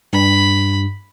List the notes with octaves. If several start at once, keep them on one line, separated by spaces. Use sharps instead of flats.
G2 B5